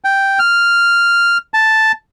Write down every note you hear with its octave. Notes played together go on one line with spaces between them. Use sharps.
G5
F6
A5